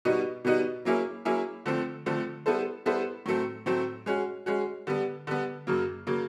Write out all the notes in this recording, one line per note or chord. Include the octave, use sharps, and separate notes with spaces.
B2 G3 B3 D#4 F#4
B2 G3 B3 D#4 F#4
F#3 A#3 C#4 E4 G#4
F#3 A#3 C#4 E4 G#4
D3 F3 A3 C4
D3 F3 A3 C4
G3 B3 E4 A4 C5
G3 B3 E4 A4 C5
A2 F#3 A3 C4
A2 F#3 A3 C4
G#3 C#4 F#4
G#3 C#4 F#4
D3 G3 B3
D3 G3 B3
F#2 C#3 F#3 A#3
C#3 F#3 A#3